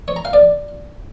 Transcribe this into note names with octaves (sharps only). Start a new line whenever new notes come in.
C#5
A#5
F5
D5